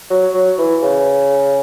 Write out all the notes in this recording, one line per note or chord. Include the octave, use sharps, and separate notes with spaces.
F#3
F#3
E3
C#3